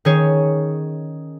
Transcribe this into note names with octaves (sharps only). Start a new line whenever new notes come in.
D#3 C#4 G#4 C#5